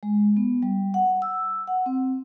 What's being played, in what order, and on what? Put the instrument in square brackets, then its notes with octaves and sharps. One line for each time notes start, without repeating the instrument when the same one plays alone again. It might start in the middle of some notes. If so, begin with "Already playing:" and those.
[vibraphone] G#3
B3
G3
F#5
E6
F#5
C4